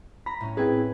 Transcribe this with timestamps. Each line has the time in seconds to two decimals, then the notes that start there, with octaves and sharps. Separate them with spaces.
0.26 A#5 B5
0.41 A2 C#4
0.57 C4 E4 G#4 B4 G#6